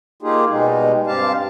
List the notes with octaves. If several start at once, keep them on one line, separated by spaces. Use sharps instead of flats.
A#3 D#4 F4 G4 G#4
B2 G3 G#3 D#4
G2 C4 G4 F5 A5